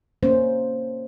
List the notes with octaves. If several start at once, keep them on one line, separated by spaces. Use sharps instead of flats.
A#3 C#4 C5